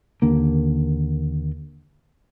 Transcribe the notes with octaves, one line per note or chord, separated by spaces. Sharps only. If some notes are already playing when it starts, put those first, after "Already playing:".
D#2 D3 A#3